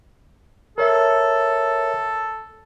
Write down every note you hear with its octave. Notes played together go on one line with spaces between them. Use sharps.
A4 A#4 C#5 E5